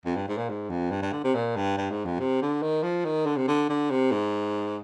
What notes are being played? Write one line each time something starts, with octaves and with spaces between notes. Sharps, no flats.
F2
G2
G#2
A#2
G#2
F2
G2
G2
D3
C3
A#2
G2
G2
G#2
F2
C3
D3
D#3
F3
D#3
D3
C3
D3
D3
C3
G#2